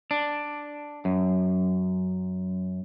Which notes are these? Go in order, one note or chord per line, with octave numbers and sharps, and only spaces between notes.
D4
F#2